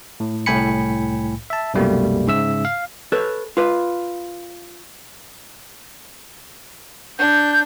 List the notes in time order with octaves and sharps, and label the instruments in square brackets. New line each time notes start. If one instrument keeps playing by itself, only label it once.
[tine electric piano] A2
C2 A2 G5 G#5 B5 C#7
E5 A5
C2 F#2 B2 G3 A3 A#3
G#2 C#3 E5 E6
F5
[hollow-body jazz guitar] A4 B4 C#5
F4 B4
[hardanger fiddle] D4 [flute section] G6